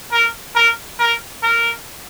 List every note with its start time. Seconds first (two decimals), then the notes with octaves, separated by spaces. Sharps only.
0.12 A#4
0.55 A#4
0.99 A#4
1.43 A#4